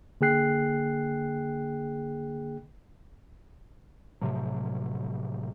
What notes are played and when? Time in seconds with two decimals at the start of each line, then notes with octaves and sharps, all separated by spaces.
0.21 D3 A#3 G#4 G5 F#6 C7
4.21 A2 C3 F3 F#3